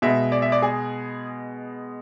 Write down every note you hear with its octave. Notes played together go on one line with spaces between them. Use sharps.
B2 G#3 B3 E5
D5
E5
D5
G#4